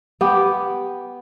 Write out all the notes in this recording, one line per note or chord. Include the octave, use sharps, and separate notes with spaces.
B3 G4